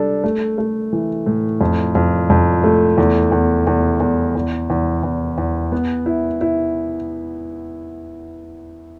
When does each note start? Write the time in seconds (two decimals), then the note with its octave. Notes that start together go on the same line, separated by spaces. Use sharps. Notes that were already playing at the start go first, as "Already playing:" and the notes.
Already playing: G3 D4 A4
0.24 A3
0.58 A3
0.93 E3
1.26 A2
1.61 F2
1.95 F2
2.30 F2
2.64 A3
2.98 E2
3.32 E2
3.67 E2
4.00 E2
4.35 E2
4.70 E2
5.03 E2
5.38 E2
5.72 B3
6.06 E4
6.41 E4